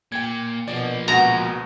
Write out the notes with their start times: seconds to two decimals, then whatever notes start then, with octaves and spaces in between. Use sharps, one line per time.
0.12 A#2 G5 G#6
0.68 B2 F3 A#3 D5
1.08 C#2 B2 F#4 A#5